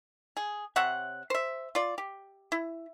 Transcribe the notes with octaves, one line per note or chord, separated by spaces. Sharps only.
G#4
C3 C#5 E5 F#5
C5 E5
F4 D5
G4
E4